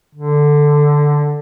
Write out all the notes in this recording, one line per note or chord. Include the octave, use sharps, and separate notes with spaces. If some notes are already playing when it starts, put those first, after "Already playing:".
D3